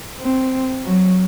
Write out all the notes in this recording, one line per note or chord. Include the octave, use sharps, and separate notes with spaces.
C4
F#3